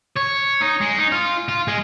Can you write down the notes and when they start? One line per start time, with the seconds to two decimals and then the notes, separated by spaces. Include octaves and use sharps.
0.17 C#5
0.61 D#4
0.81 G#3
0.99 D#4
1.12 F4
1.49 F4
1.68 G#3